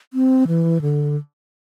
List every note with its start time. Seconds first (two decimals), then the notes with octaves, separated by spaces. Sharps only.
0.14 C4
0.47 E3
0.81 D3